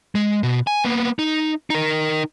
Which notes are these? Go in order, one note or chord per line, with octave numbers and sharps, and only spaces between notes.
G#3
B2
G#5
A#3 B3
D#4
D#4 A#4